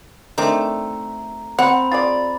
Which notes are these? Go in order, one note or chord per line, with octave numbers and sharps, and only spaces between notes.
D#3 A3 C4 D4 A#5 D6
C4 F#5 B5
F4 G#4 D5 A6